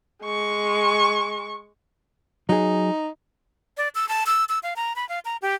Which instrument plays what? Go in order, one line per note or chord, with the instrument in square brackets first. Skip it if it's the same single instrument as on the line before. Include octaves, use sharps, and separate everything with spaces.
[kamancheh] G#3 C#6
[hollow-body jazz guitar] F#3 G#4 [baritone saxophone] D#4
[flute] D5
E6
A5
E6
E6
F5
A#5
B5
F5
A#5
G4